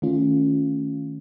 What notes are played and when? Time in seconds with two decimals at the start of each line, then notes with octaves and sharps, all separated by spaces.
0.02 D#3 A3 C#4 F4